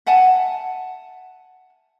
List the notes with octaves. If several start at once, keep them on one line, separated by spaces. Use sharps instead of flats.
E5 F#5 G#5 A5